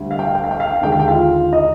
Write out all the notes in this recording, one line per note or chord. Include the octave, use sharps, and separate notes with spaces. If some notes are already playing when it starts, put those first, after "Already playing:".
Already playing: D2 D3 G3
F5
G5
F5
G5
F5
G5
F5
G5
F5
D#2 D3 G#3 G5
F5
G5
F4 F5
D#4 D#5